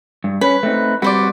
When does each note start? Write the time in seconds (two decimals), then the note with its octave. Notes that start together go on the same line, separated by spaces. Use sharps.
0.24 G2
0.41 C#4 B4
0.63 A3 C4 D#4
1.02 G3 C4 F#4 B4 C5 D5